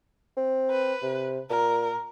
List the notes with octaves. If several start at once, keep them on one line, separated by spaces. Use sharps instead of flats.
C4
B4
C3
A#2 A#4